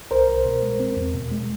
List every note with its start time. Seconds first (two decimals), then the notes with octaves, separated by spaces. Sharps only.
0.11 C2 A#4 C5
0.28 C2
0.45 B2
0.63 G#3
0.80 C4
0.97 E2
1.14 B2
1.31 G#3